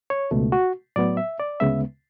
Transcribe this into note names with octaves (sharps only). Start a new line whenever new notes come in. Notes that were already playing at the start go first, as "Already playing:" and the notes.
C#5
C#2 B2 A3
F#4
A2 F#3 B3 D5
E5
D5
D2 C#3 G#3 B3 E5